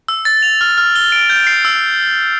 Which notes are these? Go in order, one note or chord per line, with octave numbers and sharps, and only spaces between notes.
E6
A6
F7
F6
F6
G7
D7
G6
C7
E6